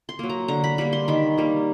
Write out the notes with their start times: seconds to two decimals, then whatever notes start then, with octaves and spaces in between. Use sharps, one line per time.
0.09 C6
0.19 F#3 A#3
0.30 A#5
0.48 D3 A#5
0.64 B5
0.78 G3 A#3 B5
0.93 C6
1.08 D#3 B5
1.38 G3 A#3